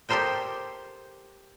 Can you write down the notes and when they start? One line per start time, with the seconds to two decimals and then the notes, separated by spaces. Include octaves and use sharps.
0.09 G4 A4 A#4 C5 D#5 G5